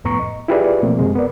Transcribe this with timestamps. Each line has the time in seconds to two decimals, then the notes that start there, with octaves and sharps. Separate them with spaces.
0.04 C2 F2 A2 B3 A#5 C#6
0.19 D#5
0.48 E4 F4 G4 G#4 B4 D5
0.83 B2 F3 A3 A#3 C4
0.98 F#2 C3 G#3
1.15 B3 A#4 D5